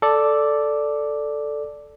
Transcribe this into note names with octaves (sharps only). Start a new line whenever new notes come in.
A4 D5